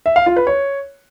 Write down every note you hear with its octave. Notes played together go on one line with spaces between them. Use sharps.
E5
F5
F4
B4
C#5